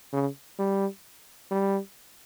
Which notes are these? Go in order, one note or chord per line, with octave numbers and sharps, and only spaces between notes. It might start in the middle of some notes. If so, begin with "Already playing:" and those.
C#3
G3
G3